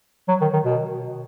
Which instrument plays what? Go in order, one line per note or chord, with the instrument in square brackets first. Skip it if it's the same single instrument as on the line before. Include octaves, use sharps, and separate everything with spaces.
[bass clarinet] F#3
D#3
D#3
B2